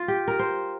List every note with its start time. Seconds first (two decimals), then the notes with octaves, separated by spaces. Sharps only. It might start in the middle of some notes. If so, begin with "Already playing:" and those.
Already playing: F4
0.08 G4
0.28 A#4
0.39 C5